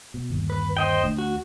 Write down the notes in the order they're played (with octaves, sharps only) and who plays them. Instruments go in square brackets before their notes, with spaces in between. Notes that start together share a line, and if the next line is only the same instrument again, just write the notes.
[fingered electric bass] B2
G1 D#2
[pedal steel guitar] B4
C5 D#5 G5
[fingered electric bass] D2
[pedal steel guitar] F#4